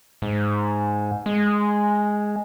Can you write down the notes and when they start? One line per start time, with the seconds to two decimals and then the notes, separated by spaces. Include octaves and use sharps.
0.22 G#2
1.26 G#3